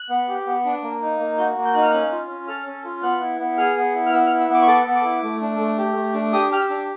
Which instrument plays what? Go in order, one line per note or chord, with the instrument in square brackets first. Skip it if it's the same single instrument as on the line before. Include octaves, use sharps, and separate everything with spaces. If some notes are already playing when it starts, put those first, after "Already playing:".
Already playing: [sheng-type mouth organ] F#6
B3
G4
B3
D4
A#3
D#4
A#3
F#4 G6
A#3
G6
D#4 F#6
F6
C#4 F#6
F4
C#4
A4 F6
C#4
F4
B3 F#6
E4
B3
G#4 F6
B3
E4
F6
B3 E6
F6
E4
E6
B3 D6
C#6
A4 D6
B3
D6
E4
A3
D4
A3
G4
A3
D4
G4 D#6
G4 F6
E6
D4